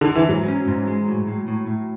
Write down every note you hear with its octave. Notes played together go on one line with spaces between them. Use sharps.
D3
E3
G#2 F#3
C#4
G#2
G#3
A2
A2
A2
A2